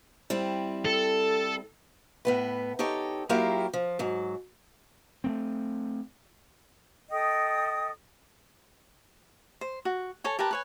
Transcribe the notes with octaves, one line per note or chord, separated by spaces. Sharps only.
G3 C4 E4
A4
A2 B3 B4
D#4 G4 A4 C#5
F#3 A#3 E4 F4 G4 A#4
F3
G#2 F#3
A3 A#3 C4
A4 D#5 G5 D#6
C5
F#4
A4 C#5 G#5
G4 A#4 B4 A5
B4 C#5 G#5